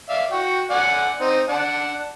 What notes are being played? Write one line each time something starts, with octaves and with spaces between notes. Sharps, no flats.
D5 E5 F5
F#4 G5
D5 F#5 G#5
C4 D#4
D4 F#5 A5